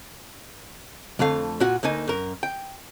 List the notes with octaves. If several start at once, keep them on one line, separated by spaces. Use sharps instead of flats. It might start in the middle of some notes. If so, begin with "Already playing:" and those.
F2 D3 A3 F5
A#2 F4 F#4 F#5
D2 A#3 D#4 G#5
F#2 A#4
G5